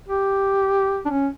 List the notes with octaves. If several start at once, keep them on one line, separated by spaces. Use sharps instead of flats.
G4
D4
C#4